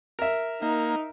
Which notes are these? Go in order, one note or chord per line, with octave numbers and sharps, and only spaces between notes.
A#4 E5
A#3 D#4